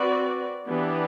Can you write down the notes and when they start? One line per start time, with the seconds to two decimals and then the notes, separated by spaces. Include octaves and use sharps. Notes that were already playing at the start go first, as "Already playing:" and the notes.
Already playing: C4 F#4 B4 D5
0.67 E3 B3 D4 G4 B4